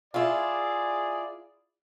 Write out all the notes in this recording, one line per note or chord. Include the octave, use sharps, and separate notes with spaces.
E4 F4 G#4 D5